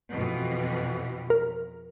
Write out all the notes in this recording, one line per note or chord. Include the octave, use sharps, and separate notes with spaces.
F2 B2 E3
A#4